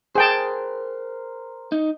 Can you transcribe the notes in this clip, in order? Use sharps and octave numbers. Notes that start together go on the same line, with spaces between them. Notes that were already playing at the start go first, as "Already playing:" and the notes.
G#4 A#4 C5 G5 A5
D#4